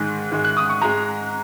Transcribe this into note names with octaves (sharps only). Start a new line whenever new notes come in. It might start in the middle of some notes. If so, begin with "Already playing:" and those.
Already playing: G#2 D#3 G#3
G#2 D#3 G#3
F#6
D#6
C#6
G#2 G#3 A#5